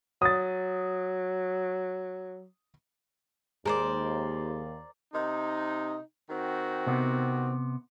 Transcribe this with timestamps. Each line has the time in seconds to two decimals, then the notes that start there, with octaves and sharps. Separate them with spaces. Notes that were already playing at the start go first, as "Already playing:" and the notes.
0.22 F#3 D#6 A6
3.65 D#2 G#3 A#4 C5 D5
5.13 C3 D#4
6.30 D#3 C4 F#4
6.87 C3 B3